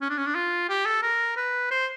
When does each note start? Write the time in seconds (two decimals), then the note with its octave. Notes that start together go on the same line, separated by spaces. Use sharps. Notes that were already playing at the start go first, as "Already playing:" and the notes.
0.01 C#4
0.09 D4
0.17 C#4
0.26 D4
0.35 F4
0.69 G4
0.86 A4
1.03 A#4
1.37 B4
1.71 C5